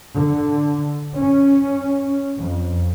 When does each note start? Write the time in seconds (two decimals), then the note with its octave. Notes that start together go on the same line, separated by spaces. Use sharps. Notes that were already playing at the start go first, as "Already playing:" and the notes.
0.14 D3
1.18 C#4
2.38 F2